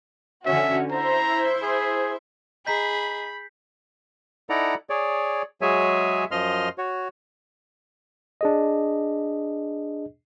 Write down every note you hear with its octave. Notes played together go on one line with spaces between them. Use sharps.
D3 C#4 F#4 E5
E4 C5 E5 A#5
G#4
G#4 D#5 A#5 B5 G6 B6 C7
D#4 E4 A4 D5 F#5 A#5
G#4 C#5 D5
F#3 G#3 G#4 C#5 E5 G#5
F#2 F3 D#5 C6 F6
F#4 C#5
D4 G#4 D#5